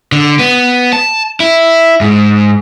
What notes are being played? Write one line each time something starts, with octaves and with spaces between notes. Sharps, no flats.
D3
B3
A5
E4
G#2